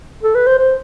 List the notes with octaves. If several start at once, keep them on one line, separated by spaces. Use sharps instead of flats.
A4
B4
C5
C5